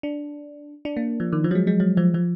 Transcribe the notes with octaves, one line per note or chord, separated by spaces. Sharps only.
D4
D4
A#3
F3
D#3
F3
F#3
G#3
G#3
F#3
F3
F3